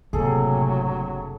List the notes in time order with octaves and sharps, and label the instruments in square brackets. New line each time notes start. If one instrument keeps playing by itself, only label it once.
[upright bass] F#1 D4 [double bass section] A2 C3 [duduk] F#3 [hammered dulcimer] G#4 A4